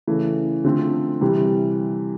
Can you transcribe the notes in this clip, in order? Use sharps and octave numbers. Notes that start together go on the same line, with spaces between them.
C#3 E3 A3
D3 F3 A3 C4
C3 E3 G3